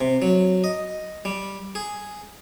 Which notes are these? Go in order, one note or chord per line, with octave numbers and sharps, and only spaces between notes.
C3
F#3
D#5
G3
G#4